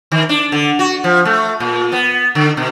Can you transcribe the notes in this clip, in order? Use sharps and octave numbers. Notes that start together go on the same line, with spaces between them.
D#3
D4
D3
F#4
F3
A3
A#2
B3
D3
B2